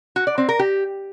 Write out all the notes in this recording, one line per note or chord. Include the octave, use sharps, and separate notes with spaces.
F#4
D5
C4
A#4
G4